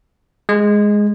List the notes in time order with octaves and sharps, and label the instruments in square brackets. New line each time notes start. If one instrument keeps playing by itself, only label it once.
[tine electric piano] G#3